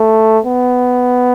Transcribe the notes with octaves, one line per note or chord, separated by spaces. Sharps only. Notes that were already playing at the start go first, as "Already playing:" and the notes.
Already playing: A3
B3